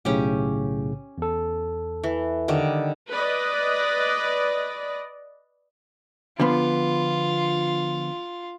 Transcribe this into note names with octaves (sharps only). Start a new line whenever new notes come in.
B1 A2 C#3 C#4 G4
E2 A4
E3
D3 D#3 G3
B4 D5 D#5
D3 F3 B3 F4